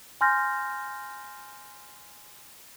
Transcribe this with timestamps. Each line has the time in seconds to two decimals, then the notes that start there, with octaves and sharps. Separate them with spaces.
0.21 G#5 C6 F6 G6 A#6